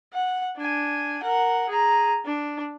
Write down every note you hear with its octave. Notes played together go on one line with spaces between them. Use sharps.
F#5
D4 G#5
A#4 F#5
G#4 A#5
D4